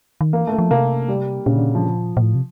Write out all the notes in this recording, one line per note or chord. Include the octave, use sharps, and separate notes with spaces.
D#3
E3 A#3
A3
A#3
F3
C3 A#3
G3
A#2 C#3
D3
F3
A#2
A2
C3